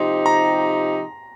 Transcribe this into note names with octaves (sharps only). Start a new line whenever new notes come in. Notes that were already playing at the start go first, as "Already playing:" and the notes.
Already playing: C3 F3 D#4 G4 C6
A#5